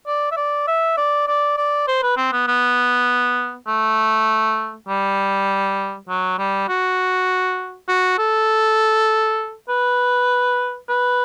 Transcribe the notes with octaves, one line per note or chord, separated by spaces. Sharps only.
D5
E5
D5
E5
D5
D5
D5
C5
B4
C4
B3
B3
A3
G3
F#3
G3
F#4
F#4
A4
B4
B4